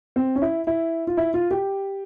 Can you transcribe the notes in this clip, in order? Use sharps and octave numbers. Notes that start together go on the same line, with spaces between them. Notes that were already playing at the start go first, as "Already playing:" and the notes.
C4
C#4
E4
E4
F4
E4
F4
G4